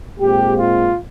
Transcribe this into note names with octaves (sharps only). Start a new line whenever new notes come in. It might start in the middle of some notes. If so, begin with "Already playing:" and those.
A#2 G#3 C4 G4
F4